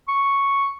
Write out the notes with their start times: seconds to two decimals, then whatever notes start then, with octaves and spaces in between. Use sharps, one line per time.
0.08 C#6